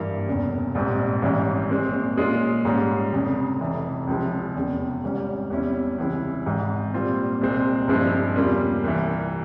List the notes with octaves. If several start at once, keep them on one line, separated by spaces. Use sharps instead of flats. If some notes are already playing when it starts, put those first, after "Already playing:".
Already playing: G#1 G2 E3 A#3 E4
F1 E2 C#3
A#1 G#2 G3 C4
G#1 G#2 E3 G3 C#4
A#2 G#3 C4
A#2 G#3 C#4 F4 G#4
G#2 G3 C#4
F1 F2 C#3
F1 F2 E3
C#2 C3 F3 G#3 E4
F1 E2 C#3
G#1 G#2 G3 C#4
E2 C3 G3 C#4 E4
C#2 C3 E3 G#3 E4
G#1 G#2 E3
A#2 G3 C4 F4
C2 A#2 G#3 C4
G2 F3 G#3 C4 E4
E2 C#3 G3 A#3 F4
C2 C3 E3